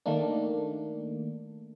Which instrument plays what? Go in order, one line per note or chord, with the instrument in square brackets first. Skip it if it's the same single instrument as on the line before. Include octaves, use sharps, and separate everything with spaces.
[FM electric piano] D#3 A3 A#3 D4